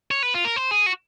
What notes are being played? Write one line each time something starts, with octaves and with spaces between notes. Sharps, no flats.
C#5
B4
F4
A#4
C5
G#4
F#4